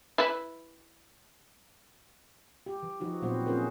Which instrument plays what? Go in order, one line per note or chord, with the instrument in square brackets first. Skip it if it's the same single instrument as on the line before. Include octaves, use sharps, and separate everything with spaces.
[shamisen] E4 B4
[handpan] G4
E3
F3 D#4 F#4 G4
A#2 F#3 B3 C4 F#4 C5
C4 C#4 F4 G#4 A#4 C5